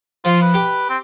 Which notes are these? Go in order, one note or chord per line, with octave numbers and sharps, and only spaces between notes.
F3 F4
B4
G4
C4